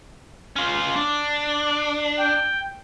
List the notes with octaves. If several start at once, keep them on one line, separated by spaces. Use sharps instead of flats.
C#4 F4
D4
G5